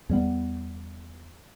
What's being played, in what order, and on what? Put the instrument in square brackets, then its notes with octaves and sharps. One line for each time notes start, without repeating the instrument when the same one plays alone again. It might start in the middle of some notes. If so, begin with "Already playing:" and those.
[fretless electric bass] E2 G3 B3